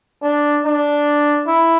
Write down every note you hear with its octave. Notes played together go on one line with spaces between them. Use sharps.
D4
D4
E4